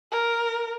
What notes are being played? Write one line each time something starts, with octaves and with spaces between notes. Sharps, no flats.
A#4